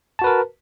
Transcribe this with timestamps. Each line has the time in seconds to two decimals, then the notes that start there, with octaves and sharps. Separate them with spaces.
0.19 A5
0.22 F#4
0.24 B4
0.27 A#4